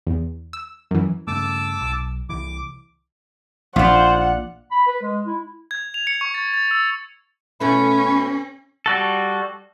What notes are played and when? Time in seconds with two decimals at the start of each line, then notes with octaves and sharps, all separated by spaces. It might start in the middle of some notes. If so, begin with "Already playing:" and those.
0.07 E2
0.53 E6
0.91 F#2 E3
1.28 G2 C#3 A3 A5 D6 E6
1.81 B1
2.29 C2 E3 D6
3.76 A#1 F4 C5 D5 F#5
4.71 B5
4.87 B4
5.02 G#3
5.26 E4
5.71 G#6
5.94 F7
6.07 C#7
6.21 C#6
6.34 A6
6.54 A6
6.71 E6
7.60 B2 A3 C#4 E4 B4
8.86 G3 F#4 A4